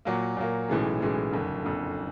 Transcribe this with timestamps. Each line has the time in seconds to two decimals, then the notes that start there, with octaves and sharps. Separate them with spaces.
0.05 A#2 F#3 A#3
0.37 A#2 F#3 A#3
0.68 B1 A2 E3 G#3 C#4
1.00 B1 A2 E3 G#3 C#4
1.32 F#1 F2 D3
1.65 F#1 F2 D3